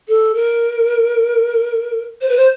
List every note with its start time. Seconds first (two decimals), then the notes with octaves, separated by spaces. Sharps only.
0.08 A4
0.35 A#4
2.21 C5
2.29 B4
2.36 C5